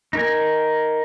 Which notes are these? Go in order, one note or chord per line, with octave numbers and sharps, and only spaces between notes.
D#4 A#4 G#5